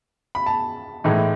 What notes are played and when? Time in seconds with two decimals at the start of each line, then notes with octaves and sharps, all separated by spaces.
0.35 B5
0.46 A5
1.04 A2 E3 G#3 D#4